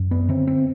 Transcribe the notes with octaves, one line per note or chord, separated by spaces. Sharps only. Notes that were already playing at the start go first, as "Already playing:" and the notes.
Already playing: F#2
B3
D3 C4
C4